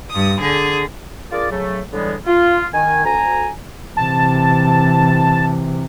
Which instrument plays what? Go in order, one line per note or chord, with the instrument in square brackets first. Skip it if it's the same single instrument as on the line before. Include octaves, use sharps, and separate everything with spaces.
[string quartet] G2 D#6
D3 G#4
[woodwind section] D4 F4 G#4 A#4 D5
C#3 F#3 A3
A2 D3 E3 G3 G#3 B3
F4
D#3 G#5
D2 G#5 A#5
[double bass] C3 E3 [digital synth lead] A5